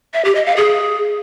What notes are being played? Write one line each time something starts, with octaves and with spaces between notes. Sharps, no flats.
E5
G4
D#5
F5
G#4